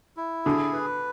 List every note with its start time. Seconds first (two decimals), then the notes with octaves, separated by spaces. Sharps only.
0.17 E4
0.45 D3 G#4
0.73 B4